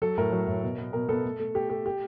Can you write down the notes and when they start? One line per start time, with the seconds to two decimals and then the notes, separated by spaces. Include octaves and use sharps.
0.02 F#3 A4
0.18 A2 A#4
0.32 F#3
0.47 A2
0.63 B2
0.78 B3
0.93 B2 A#4
1.09 B3 A4
1.24 A3
1.40 A3
1.55 A3 G4
1.70 A3 G4
1.86 G4